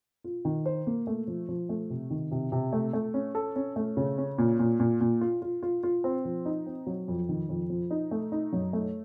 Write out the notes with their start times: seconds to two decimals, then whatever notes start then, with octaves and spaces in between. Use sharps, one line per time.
0.24 F4
0.45 D#3
0.66 C5
0.87 A#3
1.07 A3
1.27 F3
1.49 F3
1.69 A3
1.90 C3
2.10 D#3
2.31 C3
2.52 C3
2.73 A3
2.93 A3
3.14 C#4
3.35 A4
3.56 C#4
3.76 A3
3.97 C#3
4.18 C#4
4.38 A#2
4.59 A#2
4.80 A#2
5.01 A#2
5.21 F4
5.42 F4
5.63 F4
5.83 F4
6.04 C4
6.25 F3
6.45 D#4
6.66 C4
6.87 F#3
7.08 F2
7.29 D#3
7.49 F2
7.70 F3
7.91 D#4
8.11 A3
8.32 D#4
8.53 F#2
8.73 A3